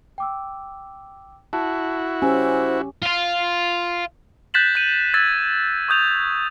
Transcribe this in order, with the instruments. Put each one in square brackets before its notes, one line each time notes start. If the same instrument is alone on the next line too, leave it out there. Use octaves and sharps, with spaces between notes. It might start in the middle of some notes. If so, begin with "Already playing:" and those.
[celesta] G5 D6 E6
[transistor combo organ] E4 F#4 [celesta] A5
[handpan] C#4 G4 [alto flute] C5 [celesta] G#5 E6
[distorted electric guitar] F4 F5
[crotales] F#6 G6 A6 B6 E7 F#7
G6 D#7
E6 G#6 A6 B6
C#6 D#6 G6 F7